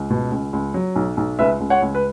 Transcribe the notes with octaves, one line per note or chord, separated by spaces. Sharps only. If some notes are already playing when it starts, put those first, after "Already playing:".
Already playing: C#2
B2
C#2
C#2
F#3
B1
B1
C#2 B4 E5
C#2
C#5 F#5
C#2
B4